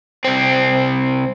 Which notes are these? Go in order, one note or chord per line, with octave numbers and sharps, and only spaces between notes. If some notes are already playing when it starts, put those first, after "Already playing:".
C2 C4